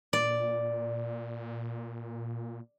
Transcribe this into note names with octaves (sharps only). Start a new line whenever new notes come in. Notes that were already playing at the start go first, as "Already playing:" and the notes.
A#2 D5